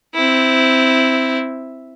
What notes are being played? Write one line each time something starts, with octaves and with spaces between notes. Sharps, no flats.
C4 E4